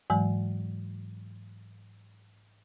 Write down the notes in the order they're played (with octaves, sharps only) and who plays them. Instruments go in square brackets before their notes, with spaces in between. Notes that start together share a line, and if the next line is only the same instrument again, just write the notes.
[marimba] G#2 E3 F#3 G#3